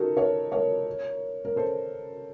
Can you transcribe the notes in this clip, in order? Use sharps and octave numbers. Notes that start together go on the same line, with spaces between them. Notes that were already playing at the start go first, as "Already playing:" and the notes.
Already playing: D#4 F4 F#4 A4 A#4
A#4 C#5
A#4 C#5
A#4
A4 C5